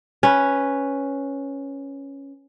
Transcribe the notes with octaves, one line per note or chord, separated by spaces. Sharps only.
C#4 B4